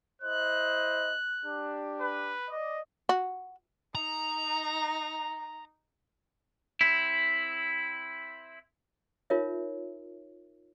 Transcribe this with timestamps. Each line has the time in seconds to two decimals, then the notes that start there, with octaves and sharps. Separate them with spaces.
0.22 E4 C5 D#5 F#6
1.44 D4 G4
2.01 B4
2.49 D5 D#5
3.09 F#4
3.95 D#4 A#5
6.81 C4 E4
9.30 D#4 F4 A#4 C#5 E5